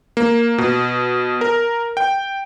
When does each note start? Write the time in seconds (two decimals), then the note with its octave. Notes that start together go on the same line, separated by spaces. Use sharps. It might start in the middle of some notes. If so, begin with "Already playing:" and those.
0.17 A#3
0.58 B2
1.41 A#4
1.97 G5